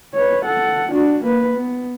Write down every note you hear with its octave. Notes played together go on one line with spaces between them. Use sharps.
B4 C#5
A4 F#5
D4 F#4
A#3 B4
B3